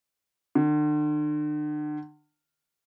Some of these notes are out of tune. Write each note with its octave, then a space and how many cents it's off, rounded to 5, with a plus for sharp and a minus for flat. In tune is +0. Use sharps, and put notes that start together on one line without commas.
D3 +40